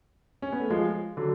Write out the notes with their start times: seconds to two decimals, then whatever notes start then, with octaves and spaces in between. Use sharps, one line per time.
0.42 C#4
0.52 B3
0.60 A3
0.70 F3 G#3
1.17 D3 F#3